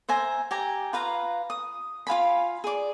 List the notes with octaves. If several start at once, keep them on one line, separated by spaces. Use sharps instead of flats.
C5 E5 G#5 A#5
G4 G#5 A#5
F4 B4 F5 A#5
D#6
F4 F5 G#5 B5
G#4 D5